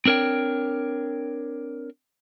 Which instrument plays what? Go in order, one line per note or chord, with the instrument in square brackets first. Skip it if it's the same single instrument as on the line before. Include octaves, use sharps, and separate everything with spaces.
[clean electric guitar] C4 D4 A#4 C#5 G5